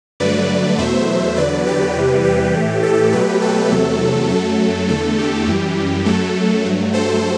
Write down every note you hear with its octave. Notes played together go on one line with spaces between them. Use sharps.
G2 D3 F#3 A3 B4 D5
E2 B2 F#3 A3 C5 E5
E2 D3 F#3 B4 D5
G4 B4
E2 C3 E3 G3
G4
A2 E3 A3
A4
B2 F#3 A3 G4 B4
A4
E2 C3 F#3 A3
F#2 F#3 A3 A4
E2 D3 A3 A4
G4
F#2 E3 G3
F#2 F#3 A3 A4
G2 F#3 A3
A4 C5